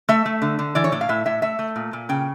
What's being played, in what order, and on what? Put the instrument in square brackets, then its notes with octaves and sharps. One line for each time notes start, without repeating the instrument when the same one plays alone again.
[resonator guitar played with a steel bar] A3 E5
A3
D3
D3
E3 D5
C#5
A2 D5
F5
A2 E5
A2 E5
A3 E5
A3
A#2
A#2
C#3 G5